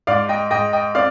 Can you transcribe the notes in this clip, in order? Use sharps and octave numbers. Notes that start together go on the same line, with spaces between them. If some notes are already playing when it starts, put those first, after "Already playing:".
G#2 D5 F5
D#5 G5
G#2 D#5 G5
D#5 G5
C4 D5 F5